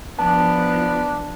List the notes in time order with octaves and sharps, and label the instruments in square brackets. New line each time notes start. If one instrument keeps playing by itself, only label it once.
[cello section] F3 [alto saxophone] B3 [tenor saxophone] D4 [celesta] A5